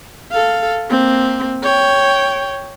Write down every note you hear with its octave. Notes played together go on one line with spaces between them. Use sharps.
A4 F5
A#3 C4
C#5 G5